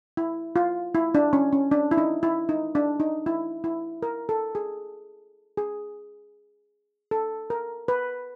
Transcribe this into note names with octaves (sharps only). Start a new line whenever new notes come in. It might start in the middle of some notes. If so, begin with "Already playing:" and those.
E4
F4
E4
D4
C#4
C#4
D4
E4
D#4
E4
D#4
D4
D#4
E4
E4
A#4
A4
G#4
G#4
A4
A#4
B4